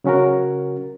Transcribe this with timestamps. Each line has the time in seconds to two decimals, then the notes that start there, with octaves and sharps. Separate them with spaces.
0.04 C#3 F#3 C#4 F#4 A#4